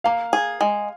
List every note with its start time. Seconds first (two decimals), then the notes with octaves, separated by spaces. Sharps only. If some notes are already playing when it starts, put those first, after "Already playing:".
0.04 A#3 F5
0.33 G#4
0.61 G#3